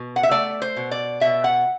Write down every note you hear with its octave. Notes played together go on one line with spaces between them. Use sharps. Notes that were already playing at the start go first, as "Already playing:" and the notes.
Already playing: B2
F#5
E5
A3 D5
C5
B2
D5
B2 E5
F#5